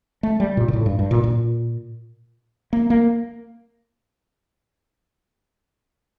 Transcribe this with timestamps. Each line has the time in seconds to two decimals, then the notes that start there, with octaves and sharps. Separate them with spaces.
0.23 A3
0.40 G3
0.57 A#2
0.68 A#2
0.73 A2
0.86 G2
0.99 G2
1.11 A#2
1.24 A#2
2.73 A#3
2.90 A#3